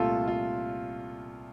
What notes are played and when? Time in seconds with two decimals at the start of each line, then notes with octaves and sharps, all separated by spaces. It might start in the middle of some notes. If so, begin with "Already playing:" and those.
Already playing: C2 A#2 A3 F4 A4
0.28 F4